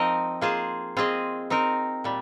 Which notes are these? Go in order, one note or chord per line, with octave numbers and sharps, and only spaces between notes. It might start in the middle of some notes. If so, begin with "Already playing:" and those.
Already playing: F3 C4 D#4 A#4 D#5
A#3 F4 G#4 C5
C4 F4 G#4 D#5
C4 D#4 A#4
A#2 G3